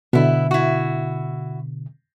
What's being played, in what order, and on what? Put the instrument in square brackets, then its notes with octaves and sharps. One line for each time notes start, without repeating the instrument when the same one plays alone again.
[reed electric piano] B2 D3 [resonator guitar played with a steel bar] B3 E4
[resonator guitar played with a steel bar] E4 F#4